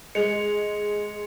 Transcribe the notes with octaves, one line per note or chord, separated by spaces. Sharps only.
G#3 C#7 F7